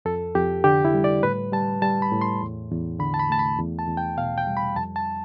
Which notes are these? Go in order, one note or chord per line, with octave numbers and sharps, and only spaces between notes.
F2 A4
F2 G4
D3 G4
E4
G3
D5
A2 B4
G3 A5
G3 A5
B5
A2
C6
E2
E2
D3 B5
A5
B5
A3 A5
B5
E2
A5
E2
G5
B2 F5
G5
G3
B5
F2 A5
A5